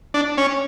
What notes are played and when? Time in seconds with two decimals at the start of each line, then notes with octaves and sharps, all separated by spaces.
0.14 D4
0.38 C#4